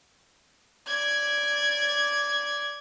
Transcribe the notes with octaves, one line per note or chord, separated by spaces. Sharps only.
D5 G#6